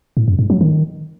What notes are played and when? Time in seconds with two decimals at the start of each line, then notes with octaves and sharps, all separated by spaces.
0.17 A2
0.28 F#2
0.39 G#2
0.50 F#3
0.61 D#3